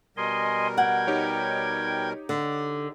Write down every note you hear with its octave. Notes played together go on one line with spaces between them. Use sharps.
B2 G3 A#4 D#5 G#5 C6
F#5 G5 G#6
D#4 G4 C#5
D3